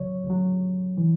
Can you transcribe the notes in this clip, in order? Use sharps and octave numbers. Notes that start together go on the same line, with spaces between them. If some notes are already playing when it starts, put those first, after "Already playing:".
Already playing: D2 C#3 F#3 C#5
D2 C#3 F#3
E3